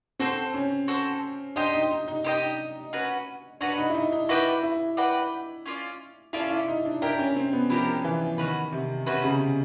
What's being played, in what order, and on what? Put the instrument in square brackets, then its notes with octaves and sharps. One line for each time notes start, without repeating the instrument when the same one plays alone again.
[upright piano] C4 [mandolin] F#4 A4 C5
[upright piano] C#4
[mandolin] F#4 A4 C5
[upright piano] D4 [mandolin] G4 C5 D#5 G5
[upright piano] D#4
D#4
D#4
[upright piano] D#4 [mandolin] G4 C5 D#5 G5
[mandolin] C#4 F#4 B4
[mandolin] C#4 F#4 B4 [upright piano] D4
[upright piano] D#4
E4
D#4
D#4
[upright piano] E4 [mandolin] F#4 B4 D5 G5
[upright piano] E4
[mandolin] F#4 B4 D5 G5
C#4 F4 A4 D5
[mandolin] C#4 F4 A4 D5 [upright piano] E4
[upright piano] E4
D#4
D4
[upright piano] D4 [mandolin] E4 G4 A#4
[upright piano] C#4
C4
B3
[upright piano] F3 [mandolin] E4 G4 A#4
[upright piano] E3
[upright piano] D#3 [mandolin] C#4 F#4 B4
[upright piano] C3
[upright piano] C3 [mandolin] C#4 F#4 B4
[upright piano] C#3
C#3